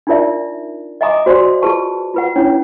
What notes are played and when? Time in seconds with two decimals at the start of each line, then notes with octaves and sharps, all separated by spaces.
0.07 D4 D#4 F4 A#4 D5 E5
1.01 D#5 E5 G#5 A#5 D6 D#6
1.26 F#4 C5 D5 G#5 C6
1.62 F4 G#4 B4 A5 C#6
2.14 F4 B4 F#5
2.36 C#4 D4 E4 C#5